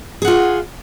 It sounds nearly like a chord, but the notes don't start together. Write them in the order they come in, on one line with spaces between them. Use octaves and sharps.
G#4 F#5 F4